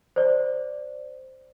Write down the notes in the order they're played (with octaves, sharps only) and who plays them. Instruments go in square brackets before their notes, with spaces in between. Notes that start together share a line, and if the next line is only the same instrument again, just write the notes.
[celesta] C5 D5